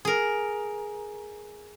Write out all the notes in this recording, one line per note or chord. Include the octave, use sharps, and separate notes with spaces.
G#4 A#4